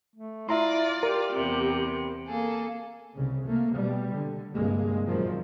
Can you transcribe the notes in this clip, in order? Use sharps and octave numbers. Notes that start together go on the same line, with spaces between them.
A3
E4 F4 D5 E5 A#5 C6
G4 A#4
E2 C3
A#3 G#4 A4
C2 C#3
A3 A#3
B2 G3
D3
C2 G2 G#3 A#3
F#2 A#2 D#3 F3